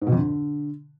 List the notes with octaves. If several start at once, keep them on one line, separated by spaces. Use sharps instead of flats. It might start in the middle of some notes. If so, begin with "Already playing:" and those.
G#2
B2
F2
D3